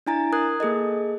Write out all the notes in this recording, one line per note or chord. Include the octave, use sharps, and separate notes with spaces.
D4 E4 G#5 A#5 A6
A#4 D#6 F#6 G#6
A#3 G#4 A4 D#5